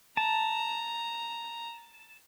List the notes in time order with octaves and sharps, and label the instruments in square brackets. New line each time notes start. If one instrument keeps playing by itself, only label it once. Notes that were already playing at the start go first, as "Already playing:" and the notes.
[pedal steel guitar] A5 [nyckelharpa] A#5